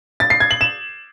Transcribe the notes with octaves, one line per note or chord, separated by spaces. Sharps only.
A6
C7
G#6
F#7
E7